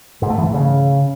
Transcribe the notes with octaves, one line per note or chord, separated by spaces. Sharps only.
G#2
A3
E3
G#2
C#3